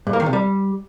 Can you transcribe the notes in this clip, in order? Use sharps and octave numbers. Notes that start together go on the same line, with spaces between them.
G2
A#3
D#3
C3
G3